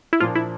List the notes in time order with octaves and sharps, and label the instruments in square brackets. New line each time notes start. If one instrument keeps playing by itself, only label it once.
[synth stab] E4
[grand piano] A#2 F3 A#3 D4 [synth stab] F4
[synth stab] E4